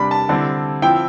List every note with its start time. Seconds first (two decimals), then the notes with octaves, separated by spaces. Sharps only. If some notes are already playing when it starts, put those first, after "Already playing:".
Already playing: C3 G3 D4 B5
0.11 A5
0.29 D3 G3 C4 E4
0.82 F3 C4 E4 G5